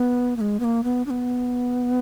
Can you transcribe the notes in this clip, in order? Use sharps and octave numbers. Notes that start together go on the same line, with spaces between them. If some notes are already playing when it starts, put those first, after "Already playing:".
Already playing: B3
A#3
G#3
B3
A#3
B3
D4
B3